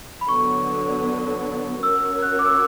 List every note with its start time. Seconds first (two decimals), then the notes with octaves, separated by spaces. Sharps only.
0.21 B5
0.28 D3 F#3 B3 C#6
1.83 C#4 F#4 A#4 C#5 E6
2.22 F#6
2.39 D6
2.46 E6